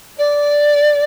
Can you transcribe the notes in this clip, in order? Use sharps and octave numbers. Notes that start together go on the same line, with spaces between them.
D5